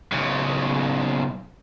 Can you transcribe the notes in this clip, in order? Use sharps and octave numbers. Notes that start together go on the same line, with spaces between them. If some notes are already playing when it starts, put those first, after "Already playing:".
B1 C#3